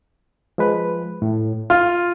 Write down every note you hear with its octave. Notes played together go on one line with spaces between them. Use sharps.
F3 G#3 B4
A2
F4 F5 F6